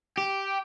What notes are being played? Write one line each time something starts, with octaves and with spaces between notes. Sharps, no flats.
G4